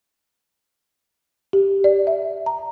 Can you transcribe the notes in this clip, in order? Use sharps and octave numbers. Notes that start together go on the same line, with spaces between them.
G4
D5
E5
A#5